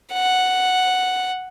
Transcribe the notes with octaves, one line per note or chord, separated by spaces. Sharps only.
F#5